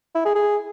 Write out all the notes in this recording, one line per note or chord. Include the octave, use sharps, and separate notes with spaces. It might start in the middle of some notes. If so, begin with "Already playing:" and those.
E4
G#4
G#4